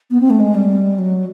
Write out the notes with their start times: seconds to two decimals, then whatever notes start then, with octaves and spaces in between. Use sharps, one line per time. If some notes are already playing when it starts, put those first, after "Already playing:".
0.10 B3
0.20 C4
0.30 A3
0.40 G#3
0.54 G3
0.98 F#3